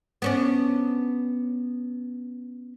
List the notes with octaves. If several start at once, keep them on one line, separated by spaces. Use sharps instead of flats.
B3 C#4 D4